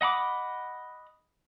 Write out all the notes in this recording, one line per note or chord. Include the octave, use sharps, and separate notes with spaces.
D#5 F#5 B5 D6